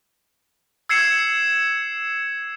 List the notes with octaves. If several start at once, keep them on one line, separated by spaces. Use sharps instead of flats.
E6 G#6 C7 C#7 E7